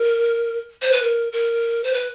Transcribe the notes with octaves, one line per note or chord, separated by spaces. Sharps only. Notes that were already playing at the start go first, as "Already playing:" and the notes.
Already playing: A#4
C5
B4
A#4
A#4
C5
B4